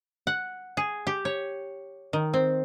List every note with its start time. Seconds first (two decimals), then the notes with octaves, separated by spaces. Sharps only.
0.27 F#5
0.77 G#4
1.07 G4
1.25 C#5
2.13 D#3
2.34 C4